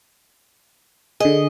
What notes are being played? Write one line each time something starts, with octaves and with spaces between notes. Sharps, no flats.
D3 G#4 D#5